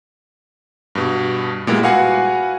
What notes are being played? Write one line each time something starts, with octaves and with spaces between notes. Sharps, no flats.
G2 B2
A#2 G3 G#3 B3 E4
F#4 B4 F5 F#5 G#5